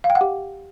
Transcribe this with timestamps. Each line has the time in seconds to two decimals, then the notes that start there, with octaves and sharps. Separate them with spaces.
0.04 F5
0.10 G5
0.15 F#5
0.21 G4